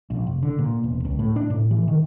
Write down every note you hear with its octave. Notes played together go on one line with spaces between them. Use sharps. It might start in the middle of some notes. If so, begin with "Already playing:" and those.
A#1
F1
D3
A#2
E1
C#2
A2
D4
A2
E3
D#3